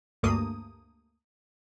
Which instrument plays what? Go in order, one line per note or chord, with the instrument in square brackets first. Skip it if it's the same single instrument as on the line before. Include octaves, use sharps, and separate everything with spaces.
[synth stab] D2 G2 A3 A#3 D#6